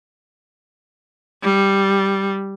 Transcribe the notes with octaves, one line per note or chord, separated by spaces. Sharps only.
G3